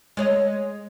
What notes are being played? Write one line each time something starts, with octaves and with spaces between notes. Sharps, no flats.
G#3 C#5 D#5